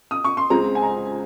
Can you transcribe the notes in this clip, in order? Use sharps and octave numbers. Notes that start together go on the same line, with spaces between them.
D#6
C#6
C6
C#2 C#3 G#3 C4 A#5
G#5
A#5